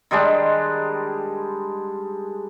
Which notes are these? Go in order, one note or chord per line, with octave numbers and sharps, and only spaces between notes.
D#3 G3 G#3 D4